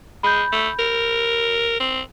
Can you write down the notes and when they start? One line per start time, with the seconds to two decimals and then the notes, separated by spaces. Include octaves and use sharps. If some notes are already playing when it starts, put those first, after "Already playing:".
0.23 G#3 B5 G6
0.52 A3
0.79 A#4
1.80 C4